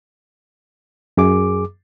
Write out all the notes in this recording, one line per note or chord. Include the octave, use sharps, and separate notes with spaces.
F#2 G#4 D6